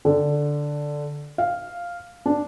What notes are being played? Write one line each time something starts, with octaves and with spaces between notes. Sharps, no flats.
D3
F5
D4